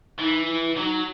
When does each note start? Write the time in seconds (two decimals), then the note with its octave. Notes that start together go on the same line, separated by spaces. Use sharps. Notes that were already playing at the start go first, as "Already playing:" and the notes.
0.19 E3 D#4
0.47 E4
0.76 F#3 D#4